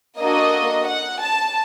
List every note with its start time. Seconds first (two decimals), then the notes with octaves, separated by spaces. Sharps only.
0.18 A#3 D4 F#4 A4 D#5
0.86 F#5
1.20 A5